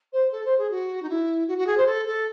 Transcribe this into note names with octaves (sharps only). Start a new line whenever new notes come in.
C5
A4
C5
G#4
F#4
D#4
E4
F#4
F#4
G#4
C5
A4
A4